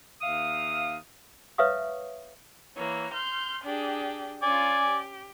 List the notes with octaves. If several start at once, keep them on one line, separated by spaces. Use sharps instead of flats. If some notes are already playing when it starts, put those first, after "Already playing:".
D#2 E5 F5 D#6
B4 C#5 E5 F5 C#6 D#6
E3 A#3 C#5
C6 F6 G6
D4 G4 G#4
C#4 F4 D5 G#5
G4